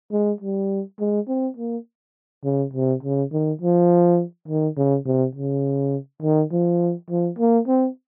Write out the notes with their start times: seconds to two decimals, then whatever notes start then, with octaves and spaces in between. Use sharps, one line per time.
0.12 G#3
0.41 G3
1.00 G#3
1.28 C4
1.57 A#3
2.45 C#3
2.74 C3
3.03 C#3
3.32 D#3
3.62 F3
4.48 D#3
4.77 C#3
5.06 C3
5.36 C#3
6.23 D#3
6.52 F3
7.10 F3
7.39 A#3
7.68 C4